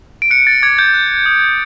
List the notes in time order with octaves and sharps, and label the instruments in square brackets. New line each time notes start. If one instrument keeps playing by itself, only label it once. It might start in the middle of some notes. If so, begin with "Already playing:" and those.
[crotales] D7
F#6 C#7
A6
D6 G#6
G6
F#6
D#6